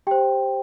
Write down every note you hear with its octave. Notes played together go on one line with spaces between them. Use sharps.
G4 C5 G5